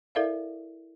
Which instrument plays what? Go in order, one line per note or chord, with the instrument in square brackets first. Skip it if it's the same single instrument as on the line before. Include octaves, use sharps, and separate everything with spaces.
[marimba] E4 A4 A#4 D5 E5 F5